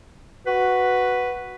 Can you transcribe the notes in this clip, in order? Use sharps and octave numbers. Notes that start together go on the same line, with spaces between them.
F#4 B4